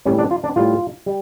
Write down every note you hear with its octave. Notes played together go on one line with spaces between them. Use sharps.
A2 G3 C#4
D4
F4
D4
A2 G3 F4
G3